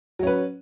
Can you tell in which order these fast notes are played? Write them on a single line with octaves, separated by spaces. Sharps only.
F#3 C#4 B4